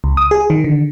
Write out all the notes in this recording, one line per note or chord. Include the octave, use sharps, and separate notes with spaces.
C#2
D#6
G#4
D#3
D3